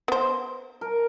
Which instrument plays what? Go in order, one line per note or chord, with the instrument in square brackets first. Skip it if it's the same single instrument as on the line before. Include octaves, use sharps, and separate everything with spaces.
[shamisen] B3 C5
[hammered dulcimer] A#4